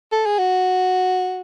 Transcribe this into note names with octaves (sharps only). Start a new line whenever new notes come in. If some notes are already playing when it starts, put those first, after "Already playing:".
A4
G#4
F#4